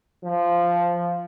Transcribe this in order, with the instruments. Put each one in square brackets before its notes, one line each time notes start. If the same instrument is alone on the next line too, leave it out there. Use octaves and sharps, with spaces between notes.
[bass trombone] F3